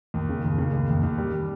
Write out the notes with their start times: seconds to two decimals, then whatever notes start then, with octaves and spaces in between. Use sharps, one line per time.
0.14 D#2
0.29 C#3
0.44 D#2
0.58 C#3
0.73 D#2
0.89 D#2
1.03 D#2
1.18 G3